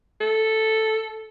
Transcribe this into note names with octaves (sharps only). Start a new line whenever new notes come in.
A4